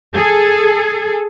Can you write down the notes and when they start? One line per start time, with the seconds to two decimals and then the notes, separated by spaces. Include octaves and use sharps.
0.14 G#4 A4